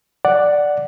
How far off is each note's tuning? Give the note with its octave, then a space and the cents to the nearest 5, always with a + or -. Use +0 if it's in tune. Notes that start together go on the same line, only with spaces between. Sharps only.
D5 +0 F#5 +0